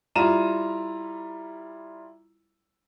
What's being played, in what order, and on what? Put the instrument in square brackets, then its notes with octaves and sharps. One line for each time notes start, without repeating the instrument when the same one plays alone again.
[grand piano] G3 E4 F4 A#5 D#7 E7